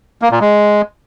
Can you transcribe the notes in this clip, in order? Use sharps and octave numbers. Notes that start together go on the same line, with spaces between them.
A#3
A#2
G#3